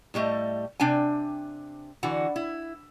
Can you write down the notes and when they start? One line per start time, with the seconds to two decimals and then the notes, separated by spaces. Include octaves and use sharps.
0.14 A2 G3 A3 D#5
0.80 C3 D4 G5 G#5
2.03 D3 E3 F#4
2.36 E4